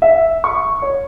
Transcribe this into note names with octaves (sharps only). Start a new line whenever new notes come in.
E5
C#6
C#5